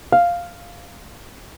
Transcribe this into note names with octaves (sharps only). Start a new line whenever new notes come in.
F5